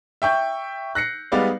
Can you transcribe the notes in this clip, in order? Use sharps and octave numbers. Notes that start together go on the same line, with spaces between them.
E5 G5 C#6 G6
F#6 A#6 C7 C#7
G3 G#3 B3 D#4 D5 F5